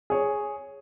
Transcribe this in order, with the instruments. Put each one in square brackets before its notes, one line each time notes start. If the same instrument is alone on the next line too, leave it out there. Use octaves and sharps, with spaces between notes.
[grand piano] G#4 C#5